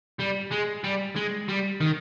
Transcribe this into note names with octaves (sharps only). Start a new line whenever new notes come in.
G3
G#3
G3
G#3
G3
D#3